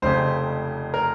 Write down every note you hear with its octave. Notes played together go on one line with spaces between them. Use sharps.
F1 F2 C#3 C5
A#4